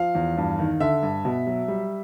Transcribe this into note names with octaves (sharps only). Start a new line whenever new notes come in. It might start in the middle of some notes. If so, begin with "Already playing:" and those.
Already playing: F3 F5
E2
G2
D#3
D3 E5
G2
B2
F#3
G3